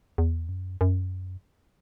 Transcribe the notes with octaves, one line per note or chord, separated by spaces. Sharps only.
E2
F#2
F#2